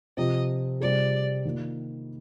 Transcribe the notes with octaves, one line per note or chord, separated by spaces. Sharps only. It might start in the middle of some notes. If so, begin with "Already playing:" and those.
C3 F3 C4 D#5
C3 G3 C4 F4 G#4 D5
D#3 A#3 F4